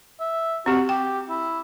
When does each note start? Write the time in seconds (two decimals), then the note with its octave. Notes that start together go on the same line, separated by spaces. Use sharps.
0.20 E5
0.66 C4 F#4 G4
0.89 G4 G5
1.29 E4